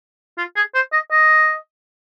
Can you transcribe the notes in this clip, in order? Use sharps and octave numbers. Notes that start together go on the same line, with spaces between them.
F4
G#4
C5
D#5
D#5